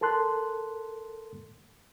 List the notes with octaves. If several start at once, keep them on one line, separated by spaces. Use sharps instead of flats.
A4 A#4 A5 C6 F#6